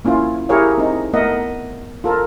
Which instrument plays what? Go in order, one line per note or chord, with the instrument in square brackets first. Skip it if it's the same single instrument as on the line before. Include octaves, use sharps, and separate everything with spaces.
[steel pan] A#3 C#4 E4 F4
E4 G4 G#4 A#4 C#5 F5
C4 D#4
A3 B3 A#4 D#5 E5 F#5
F4 A4 A#4